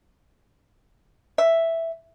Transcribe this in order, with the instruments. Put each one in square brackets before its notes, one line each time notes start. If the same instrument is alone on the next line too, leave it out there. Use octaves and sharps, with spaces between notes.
[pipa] E5